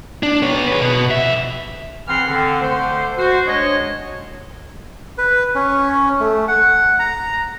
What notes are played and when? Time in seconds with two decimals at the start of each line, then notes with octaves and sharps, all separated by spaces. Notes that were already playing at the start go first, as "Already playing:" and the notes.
0.23 D4
0.43 B3 C#5
0.68 G#4 B4
0.81 B2 B3
1.11 F2 E5
2.08 E3 C4 G#4 F#5 C6 F6
2.28 D3 C4
2.62 D3 A3 C5
3.18 F#4 C5
3.47 G#3 D4 C#5 D#5
5.18 B4
5.55 C#4
6.20 A3
6.48 F#5
6.99 A#5